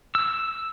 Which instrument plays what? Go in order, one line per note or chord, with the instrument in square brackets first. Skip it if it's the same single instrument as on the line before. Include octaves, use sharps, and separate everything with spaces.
[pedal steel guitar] E6